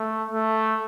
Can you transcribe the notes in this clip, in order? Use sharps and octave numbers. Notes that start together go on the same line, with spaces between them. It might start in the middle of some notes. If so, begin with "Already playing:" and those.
Already playing: A3
A3